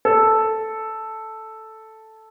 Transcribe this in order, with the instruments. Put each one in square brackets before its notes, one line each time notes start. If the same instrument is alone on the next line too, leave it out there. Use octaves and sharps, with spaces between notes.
[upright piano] A4